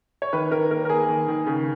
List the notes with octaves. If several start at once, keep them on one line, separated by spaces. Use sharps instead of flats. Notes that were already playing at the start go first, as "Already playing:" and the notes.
C#5
D#3 B4
D#3 A#4
A#3 A#4
A#4
A#3 G#4
D#3
D#3
C#3